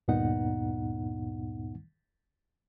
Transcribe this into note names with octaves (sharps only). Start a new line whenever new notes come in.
D2 G2 A#2 B3 D#4 F#5